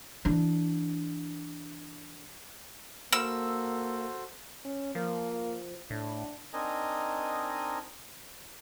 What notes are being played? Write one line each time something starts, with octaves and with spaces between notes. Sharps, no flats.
E3 D4
A#3 F#4 A4 C5 E6
C#4
F3 A#3
A2 D4
C4 D4 D#4 A#4 D#5 G#5